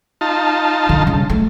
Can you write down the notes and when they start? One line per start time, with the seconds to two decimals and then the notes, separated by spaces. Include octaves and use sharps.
0.21 D#4 F4 A5
0.89 D3
1.07 C#3 G3
1.30 A3